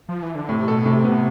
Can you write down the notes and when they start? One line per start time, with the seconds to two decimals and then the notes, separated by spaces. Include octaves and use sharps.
0.09 F3
0.23 E3
0.35 D3
0.49 A2 C3
0.67 B2 A4
0.86 A2 C3
1.04 B3